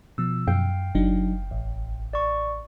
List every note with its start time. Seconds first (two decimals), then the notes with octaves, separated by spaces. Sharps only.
0.18 B2 F3 E6
0.47 F#2 F5 G5 G6
0.95 F#1 F#3 D4 D#4
1.51 A1
2.13 D5 C#6